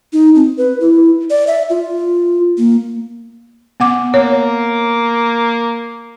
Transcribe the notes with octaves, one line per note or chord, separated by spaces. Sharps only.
D#4
C4
B4
E4
D5
E5
F4
A#3
B3 F#5 D6
A#3 C#5